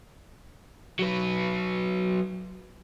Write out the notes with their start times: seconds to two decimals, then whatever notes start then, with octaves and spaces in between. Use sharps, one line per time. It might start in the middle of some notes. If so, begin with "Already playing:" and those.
0.99 F#3 B4